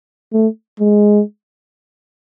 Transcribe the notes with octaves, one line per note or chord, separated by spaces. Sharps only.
A3
G#3